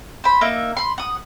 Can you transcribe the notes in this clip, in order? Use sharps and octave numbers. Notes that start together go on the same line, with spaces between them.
C5 B5
A#3 D#4 E5
B5 C6
F#5 D#6